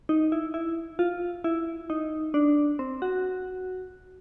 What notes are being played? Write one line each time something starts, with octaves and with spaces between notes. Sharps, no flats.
D#4
E4
E4
F4
E4
D#4
D4
C4
F#4